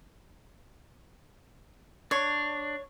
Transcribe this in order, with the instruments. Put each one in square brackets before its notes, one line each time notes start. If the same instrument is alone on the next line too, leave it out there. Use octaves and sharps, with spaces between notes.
[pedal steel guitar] D4 [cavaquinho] C#5